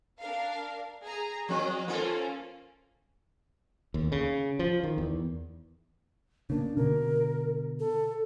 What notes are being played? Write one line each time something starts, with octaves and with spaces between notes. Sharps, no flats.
D4 A#4 F5
G#4 A#5
F3 A#3 C4 D#5
A#3 C#4 F4 A4 C5
D#2
C#3
F3
D#3
E2
C#3 A#3 D4
B2 D3 A#4
A4